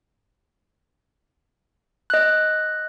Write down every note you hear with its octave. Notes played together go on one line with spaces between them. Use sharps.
D#5 F#6